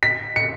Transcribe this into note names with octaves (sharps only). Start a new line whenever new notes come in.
B6
C#7